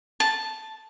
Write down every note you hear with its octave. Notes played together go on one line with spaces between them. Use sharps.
A5